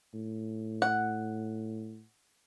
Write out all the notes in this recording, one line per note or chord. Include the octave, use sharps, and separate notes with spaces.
A2
F#5